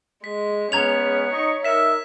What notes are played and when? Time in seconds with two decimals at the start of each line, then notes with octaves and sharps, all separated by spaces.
0.24 G#3 B6
0.72 G#3 B3 C#4 C#5 A#5 G#6 F7
1.31 D#4 D#5 C#6
1.65 D#4 A#4 E5 B6 E7